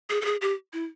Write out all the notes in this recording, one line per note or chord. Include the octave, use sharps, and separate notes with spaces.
G#4
A4
G#4
G4
E4